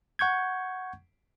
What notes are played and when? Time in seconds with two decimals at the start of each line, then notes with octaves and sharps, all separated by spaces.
0.19 F#5 C#6 G6 G#6